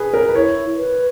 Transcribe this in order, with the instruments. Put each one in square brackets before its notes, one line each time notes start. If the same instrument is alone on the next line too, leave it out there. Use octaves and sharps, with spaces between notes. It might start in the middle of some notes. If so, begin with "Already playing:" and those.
Already playing: [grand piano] G#4 B4
A#4
B4
[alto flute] E4 [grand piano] C#5
[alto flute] B4